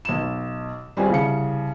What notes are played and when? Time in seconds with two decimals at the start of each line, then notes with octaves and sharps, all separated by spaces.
0.05 B1 E7
0.97 G3 C4 C#4 E4 F4 G#4
1.10 C2 C#3 C#7